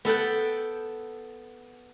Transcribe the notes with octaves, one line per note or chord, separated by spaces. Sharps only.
B3 A4 F#5 G5